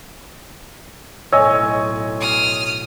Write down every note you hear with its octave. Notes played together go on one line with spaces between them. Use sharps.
B1 A2 C#5 D#5 G#5 E6
D#6 F6